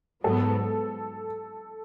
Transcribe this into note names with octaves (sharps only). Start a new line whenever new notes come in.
G#2 F#3 B3 A4